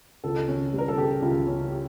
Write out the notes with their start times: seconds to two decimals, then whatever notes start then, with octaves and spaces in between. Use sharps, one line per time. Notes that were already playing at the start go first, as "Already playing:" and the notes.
0.24 C#2 A4
0.48 C#4
0.73 G3
0.78 A#4
0.88 A4
0.98 C#3 G4
1.22 C#2
1.47 C#4
1.72 G4